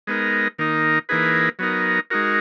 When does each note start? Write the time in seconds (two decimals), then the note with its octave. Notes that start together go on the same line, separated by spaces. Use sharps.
0.07 G#3 B3 D#4 A#4
0.59 D#3 A#3 D#4
1.09 E3 A#3 D#4 G#4 B4
1.59 F#3 B3 D#4 A#4
2.10 G#3 D#4 F#4 A#4